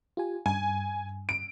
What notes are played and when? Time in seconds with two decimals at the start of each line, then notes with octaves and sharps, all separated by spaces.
0.17 F4 G4 G#5
0.46 G2 G#5
1.29 D7